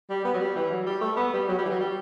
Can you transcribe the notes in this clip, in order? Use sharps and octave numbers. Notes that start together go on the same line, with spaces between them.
G3
B3
F#3
G3
E3
F#3
G3
A3
B3
G3
F#3
G3
E3
F#3
G3